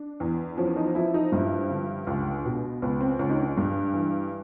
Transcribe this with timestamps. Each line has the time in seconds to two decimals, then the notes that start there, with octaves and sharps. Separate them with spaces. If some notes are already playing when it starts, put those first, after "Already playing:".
Already playing: D4
0.20 E2
0.58 F3 C#4
0.76 D#4
0.95 F3 E4
1.14 D#4
1.32 G2 E4
1.71 D3
2.07 C#2
2.45 B2
2.82 C#2 B3
3.01 C4
3.19 C#2 C#4
3.29 D#4
3.38 D4
3.57 G2
3.93 E3